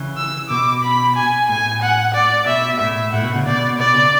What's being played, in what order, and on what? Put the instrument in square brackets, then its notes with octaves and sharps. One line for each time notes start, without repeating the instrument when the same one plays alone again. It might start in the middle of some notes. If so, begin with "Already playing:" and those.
Already playing: [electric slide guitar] C#3 E3
[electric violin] E6
[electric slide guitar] B2 [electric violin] D6
[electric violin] B5
G#5
[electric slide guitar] A2 [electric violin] G#5
[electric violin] F#5
D5
[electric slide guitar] B2 [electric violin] E5
[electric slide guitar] A2 [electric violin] E5
[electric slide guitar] A2 [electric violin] F#5
[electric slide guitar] B2
C#3
[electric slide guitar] B2 [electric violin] D5
[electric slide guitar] B2 [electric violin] D5
[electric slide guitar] C#3